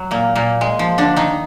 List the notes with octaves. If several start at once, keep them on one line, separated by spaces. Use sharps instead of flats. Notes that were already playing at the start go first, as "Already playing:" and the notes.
Already playing: F#3
A#2 A#3
A#2 A#3
G#3
F3
D3 D4
D#3 D#4